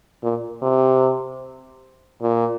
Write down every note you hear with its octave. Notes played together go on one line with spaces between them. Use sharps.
A#2
C3
A#2